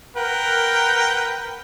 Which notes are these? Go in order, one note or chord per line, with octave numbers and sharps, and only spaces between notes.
A#4 B4 F#5 G5